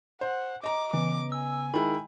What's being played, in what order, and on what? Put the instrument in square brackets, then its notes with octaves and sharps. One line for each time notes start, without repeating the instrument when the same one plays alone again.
[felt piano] C5 [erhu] F#5
[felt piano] D#5 A#5 [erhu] D6
[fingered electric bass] C#3 B3 [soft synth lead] E3 [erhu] D6
[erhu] G#5 [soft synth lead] E6
[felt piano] D#3 G#3 E4 [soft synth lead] B5